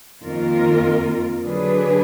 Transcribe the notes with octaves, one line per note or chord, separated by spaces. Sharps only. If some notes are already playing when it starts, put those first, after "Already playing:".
F2 D#3 A#3 F4 A#4
D3 F#3 D4 G#4 B4